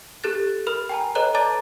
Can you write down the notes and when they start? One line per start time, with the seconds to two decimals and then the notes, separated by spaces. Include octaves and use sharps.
0.24 G4 A4 F#6 A6
0.67 A#4 B5 F6
0.89 G5 G#5 A#5
1.15 A4 B4 C#5 D#5 A#5 F#6
1.34 D5 A5 A#5 D6 A6